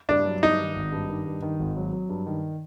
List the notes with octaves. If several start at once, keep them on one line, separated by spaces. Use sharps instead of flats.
G2 D4
F#3
G2 D#4
D#3
G#1
G2
D#3
G2
D#3
G#1
F#3
F#3
G2
D#3